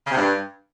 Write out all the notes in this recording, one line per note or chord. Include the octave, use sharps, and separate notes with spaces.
C#3
C3
G2